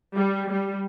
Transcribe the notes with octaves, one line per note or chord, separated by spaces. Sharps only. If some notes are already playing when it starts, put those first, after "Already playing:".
G3
G3